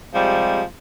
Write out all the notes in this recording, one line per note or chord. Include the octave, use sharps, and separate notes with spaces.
C3 F3 G3 G#3